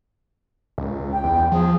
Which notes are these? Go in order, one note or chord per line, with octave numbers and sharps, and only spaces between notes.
C#2
G5
E2
F3 G#4